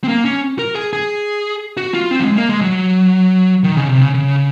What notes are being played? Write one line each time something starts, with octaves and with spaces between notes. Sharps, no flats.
C4
A#3
C#4
A#4
G#4
G#4
F#4
F4
C4
F#3
G#3
A#3
G#3
F#3
D#3
C#3
C3
C#3
C#3